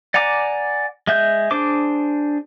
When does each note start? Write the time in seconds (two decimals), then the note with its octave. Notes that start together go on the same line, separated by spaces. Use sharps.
0.14 D5 F#5 G#5 A#5 D6
1.07 G#3 E5 G6
1.51 D4 G#4 C5 D6